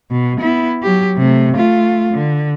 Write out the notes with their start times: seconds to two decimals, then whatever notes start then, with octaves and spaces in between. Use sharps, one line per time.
0.11 B2
0.40 B3 E4
0.83 F#3 G4
1.17 C3 A3
1.55 A3 F4
2.13 D3